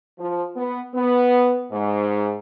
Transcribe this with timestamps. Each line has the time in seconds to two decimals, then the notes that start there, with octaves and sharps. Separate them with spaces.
0.19 F3
0.56 B3
0.95 B3
1.71 G#2